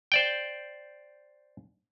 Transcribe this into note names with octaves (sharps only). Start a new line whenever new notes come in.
C5 D5 G5